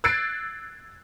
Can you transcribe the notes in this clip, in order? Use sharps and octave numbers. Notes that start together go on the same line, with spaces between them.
E6 F#6 G#6 A6 C7 D7